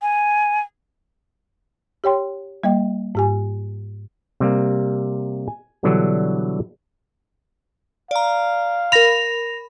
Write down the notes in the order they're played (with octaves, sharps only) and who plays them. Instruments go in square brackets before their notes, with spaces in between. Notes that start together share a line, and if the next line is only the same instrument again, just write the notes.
[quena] G#5
[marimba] G4 C#5 G5 C6
G3 A#3 D#5 G5
G#2 G4 G#5
[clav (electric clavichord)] C3 G3 A#3
G#5
B2 D3 E3 F#3 G3 D4
[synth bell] D5 A#5 [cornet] F5
[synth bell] A#4 B5 [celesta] A#6 F7